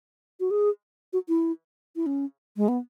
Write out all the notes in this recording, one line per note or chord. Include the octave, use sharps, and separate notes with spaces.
F#4
G#4
F#4
E4
E4
C#4
G#3
B3